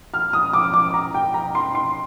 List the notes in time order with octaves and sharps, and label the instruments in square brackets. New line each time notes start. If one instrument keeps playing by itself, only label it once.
[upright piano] F6
D#6
D6
D6
A#5
G5
A#5
C6
C6